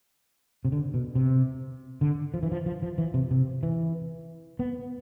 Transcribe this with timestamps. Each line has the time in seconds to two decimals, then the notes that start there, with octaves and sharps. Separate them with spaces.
0.65 C3
0.72 D3
0.94 B2
1.15 C3
2.01 D3
2.34 F3
2.43 E3
2.52 F3
2.66 F3
2.83 F3
2.98 E3
3.14 C3
3.31 C3
3.63 E3
4.59 B3